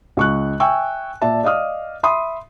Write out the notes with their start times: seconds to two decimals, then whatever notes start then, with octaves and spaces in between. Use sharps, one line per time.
0.17 C#2 C#6 F#6
0.60 E5 G5 G#5 C#6 E6
1.22 A#2 D5 E5 A5
1.43 D5 D#5 F5 D#6 F6
2.03 E5 B5 C6 D#6